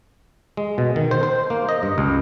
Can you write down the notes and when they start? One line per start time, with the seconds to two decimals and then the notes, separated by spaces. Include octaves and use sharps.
0.57 G#3
0.78 B2
0.96 D#3
1.11 C5
1.23 C5
1.50 A#3
1.69 D#5
1.83 G2
1.98 C#2